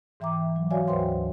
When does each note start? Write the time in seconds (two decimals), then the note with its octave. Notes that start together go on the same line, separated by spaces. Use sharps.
0.20 G#2 E3 E5 G5 A#5 D6
0.56 F#3
0.70 F#4 C#5 D5 E5 F5 G#5
0.88 D2 G#2 B4 C5 G5 C6